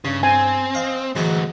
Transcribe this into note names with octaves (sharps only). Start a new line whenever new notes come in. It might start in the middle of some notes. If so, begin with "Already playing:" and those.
G2 C#3
C4 G#5
D#5 F5
D2 G#2 E3 F#3 D#4